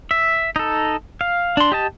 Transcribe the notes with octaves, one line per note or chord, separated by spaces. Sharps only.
E5
D#4 A4
F5
D4 C6
G4 D#5 A5